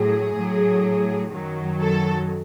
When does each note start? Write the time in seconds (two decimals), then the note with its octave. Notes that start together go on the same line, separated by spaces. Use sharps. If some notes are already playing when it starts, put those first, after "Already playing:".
Already playing: A2 F#3 G#4
0.34 A2 F#3
1.31 F#2 D#3 F#3
1.80 A4